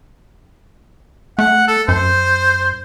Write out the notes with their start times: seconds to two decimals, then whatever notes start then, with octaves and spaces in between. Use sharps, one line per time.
1.39 A3 F#5
1.68 A4
1.88 F#2 C5